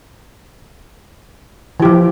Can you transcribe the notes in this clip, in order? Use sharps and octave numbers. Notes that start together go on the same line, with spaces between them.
E3 F3 G4